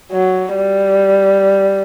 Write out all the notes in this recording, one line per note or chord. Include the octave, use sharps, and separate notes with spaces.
F#3
G3